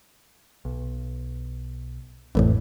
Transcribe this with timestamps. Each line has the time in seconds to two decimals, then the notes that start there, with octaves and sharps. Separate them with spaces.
0.65 B1
2.35 A1 F2 A2 E3 A3